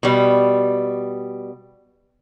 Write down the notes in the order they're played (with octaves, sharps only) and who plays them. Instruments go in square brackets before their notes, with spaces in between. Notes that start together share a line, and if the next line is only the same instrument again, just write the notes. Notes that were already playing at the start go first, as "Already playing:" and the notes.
[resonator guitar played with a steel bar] B2 G3